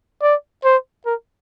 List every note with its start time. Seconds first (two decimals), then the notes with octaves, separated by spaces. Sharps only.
0.22 D5
0.64 C5
1.06 A#4